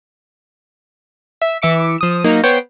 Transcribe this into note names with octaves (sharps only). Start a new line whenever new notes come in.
E5
E3 E5 D6 C#7
F3 D#6 E7
F#3 A#3 D#4
B3 C5 C#5 G5